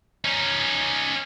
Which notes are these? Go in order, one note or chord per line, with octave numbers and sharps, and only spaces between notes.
C#4 D#4